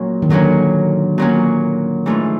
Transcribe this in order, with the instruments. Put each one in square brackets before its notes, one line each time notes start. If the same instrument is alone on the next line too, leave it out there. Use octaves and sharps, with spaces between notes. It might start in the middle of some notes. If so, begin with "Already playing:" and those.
Already playing: [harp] A#2 F#3 A#3 C#4 F#4
[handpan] D#3
[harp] A#2 F#3 A#3 C#4 F#4 [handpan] D3
[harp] A#2 F#3 A#3 C#4 F#4
G#2 E3 A3 D4 F4